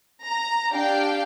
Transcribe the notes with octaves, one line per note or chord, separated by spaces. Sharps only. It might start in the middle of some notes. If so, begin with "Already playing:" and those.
A#5
D4 G4 F5 G5